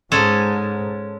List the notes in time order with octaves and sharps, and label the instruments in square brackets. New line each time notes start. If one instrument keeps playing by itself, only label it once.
[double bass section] G#2 [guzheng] G#3 C#4 A4